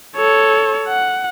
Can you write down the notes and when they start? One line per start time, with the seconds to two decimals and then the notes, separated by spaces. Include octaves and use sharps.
0.16 A4 C#5
0.88 F#5